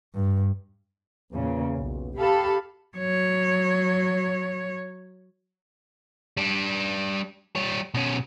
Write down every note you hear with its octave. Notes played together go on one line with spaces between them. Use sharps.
G2
E2 A#2 C#3
B1
G4 A4 F5 B5
F#3 C#5
G3 D4
G3 C#5
B2 C#4